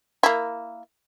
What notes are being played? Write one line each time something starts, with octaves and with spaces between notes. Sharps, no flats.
A#3 E4